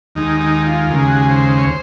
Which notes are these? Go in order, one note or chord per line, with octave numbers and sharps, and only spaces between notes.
D#2 D#3 G#3 D#4
D#4
F4
D#2 C#3 G#3 A#4
G#4
F#4
G#4
C5
C#5
C5